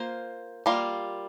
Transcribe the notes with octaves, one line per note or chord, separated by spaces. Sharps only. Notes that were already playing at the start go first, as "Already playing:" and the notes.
Already playing: A#3 F4 C5
G3 A#3 F4